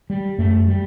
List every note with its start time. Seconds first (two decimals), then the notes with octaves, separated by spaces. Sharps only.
0.10 G3
0.38 F#2 A3
0.68 G3